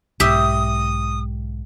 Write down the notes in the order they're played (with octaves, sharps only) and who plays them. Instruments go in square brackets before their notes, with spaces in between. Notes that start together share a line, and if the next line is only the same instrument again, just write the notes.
[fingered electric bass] B1 G#2 [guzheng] G4 E5 [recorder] D#6